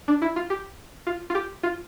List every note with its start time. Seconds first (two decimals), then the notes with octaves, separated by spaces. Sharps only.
0.08 D4
0.22 E4
0.36 F4
0.50 G4
1.07 F4
1.30 F4
1.35 G4
1.63 F4